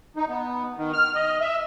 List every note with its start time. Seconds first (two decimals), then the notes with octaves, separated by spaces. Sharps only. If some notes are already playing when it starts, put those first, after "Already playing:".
0.16 D#4
0.29 B3
0.77 D#3
0.93 F6
1.15 D#5
1.41 E5